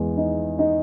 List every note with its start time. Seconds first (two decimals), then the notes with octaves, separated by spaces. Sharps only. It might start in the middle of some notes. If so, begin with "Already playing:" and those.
Already playing: E2 G#3
0.17 D#4
0.59 D#4